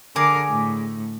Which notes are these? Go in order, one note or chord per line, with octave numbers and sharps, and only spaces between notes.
D3 G#4 A#4 D6
A2